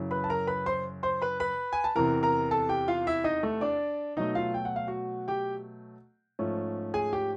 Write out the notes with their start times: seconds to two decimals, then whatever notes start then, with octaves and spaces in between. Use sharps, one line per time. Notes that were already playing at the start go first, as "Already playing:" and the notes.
Already playing: F#2 C#3 E3
0.11 B4 B5
0.24 A5
0.30 A#4 A#5
0.47 B4 B5
0.66 C5 C6
1.03 C5 C6
1.22 B4 B5
1.40 B4 B5
1.73 G#5
1.84 A5
1.95 E2 C3 E3 A#4 A#5
2.23 A#4 A#5
2.51 A4 A5
2.69 G4 G5
2.88 F4 F5
3.07 E4 E5
3.24 D#4 D#5
3.43 A3 A4
3.61 D4 D5
4.17 B2 F#3 A3 D#4 D#5
4.35 F4 F5
4.54 G5
4.65 F#5
4.76 F5
4.87 F#4 F#5
5.28 G4 G5
6.39 G#2 F3 A3 C#4
6.94 G#4 G#5
7.13 G4 G5